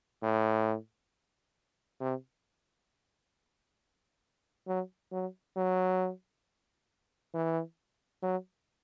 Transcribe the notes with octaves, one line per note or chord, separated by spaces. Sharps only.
A2
C3
F#3
F#3
F#3
E3
F#3